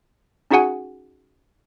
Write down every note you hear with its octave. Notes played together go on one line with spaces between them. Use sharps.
C#4 D#4 F#4 G#4 F#5 G#5